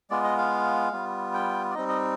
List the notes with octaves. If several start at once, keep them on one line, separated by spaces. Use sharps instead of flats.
G#3 B3 F4 D5
D#5
F5
G3 B3 F4
G5
D5
G3 C4 D#4 D#5
D#5